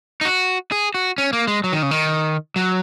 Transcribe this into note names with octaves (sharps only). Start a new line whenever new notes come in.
D#4
F#4
G#4
F#4
C#4
A#3
G#3
F#3
D#3
C#3
D#3
F#3